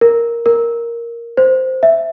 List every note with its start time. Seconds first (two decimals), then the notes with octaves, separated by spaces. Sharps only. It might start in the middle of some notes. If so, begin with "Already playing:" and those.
0.01 A#4
0.46 A#4
1.37 C5
1.83 E5